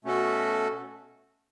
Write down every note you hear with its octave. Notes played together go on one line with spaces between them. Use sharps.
B2 A3 C#4 F#4 A4